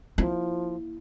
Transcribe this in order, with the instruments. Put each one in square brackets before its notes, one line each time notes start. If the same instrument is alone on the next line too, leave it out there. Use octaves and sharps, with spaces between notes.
[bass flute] F3 [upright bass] A#3 E4